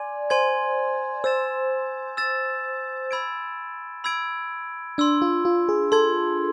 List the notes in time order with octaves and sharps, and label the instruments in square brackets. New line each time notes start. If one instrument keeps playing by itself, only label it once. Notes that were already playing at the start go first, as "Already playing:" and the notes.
Already playing: [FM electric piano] D5 [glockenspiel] G#5 C6 G#6
[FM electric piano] C5 [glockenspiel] G#5 C6 G#6
[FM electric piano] C5 [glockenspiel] E6 A6 E7
[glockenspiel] E6 A6 E7
B5 E6 G#6 D7
B5 E6 G#6 D7
[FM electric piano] D4 [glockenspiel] C6 E6 G#6
[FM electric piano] F4
F4
G#4
[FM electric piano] A4 [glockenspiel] C6 E6 G#6